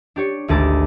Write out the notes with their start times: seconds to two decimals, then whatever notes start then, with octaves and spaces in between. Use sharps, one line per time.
0.16 D4 G4 C#5
0.48 G#1 D2 G#4 A5 D6